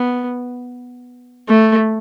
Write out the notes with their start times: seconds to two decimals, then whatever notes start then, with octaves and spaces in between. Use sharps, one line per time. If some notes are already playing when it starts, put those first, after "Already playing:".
Already playing: B3
1.48 A3